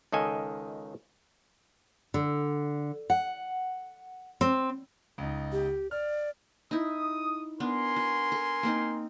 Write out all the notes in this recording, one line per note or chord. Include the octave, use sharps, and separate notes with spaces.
C#2 D#3 A4 D#5 G#5
D3
F#5
C4
C#2 D#4
G4
D5 F6
D#4 E4 D#6
B3 D4 A#4 G#5 C6
F#4
A4
A#3 C4 D#4